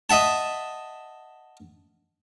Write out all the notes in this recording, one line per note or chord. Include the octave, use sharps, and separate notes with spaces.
D#5 E5 F#5 A5